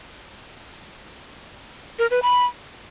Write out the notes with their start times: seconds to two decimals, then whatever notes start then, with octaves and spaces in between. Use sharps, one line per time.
1.99 A#4
2.11 B4
2.22 B5